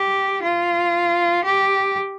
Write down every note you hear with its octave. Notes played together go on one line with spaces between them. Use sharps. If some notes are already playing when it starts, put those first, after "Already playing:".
Already playing: G4
F4
G4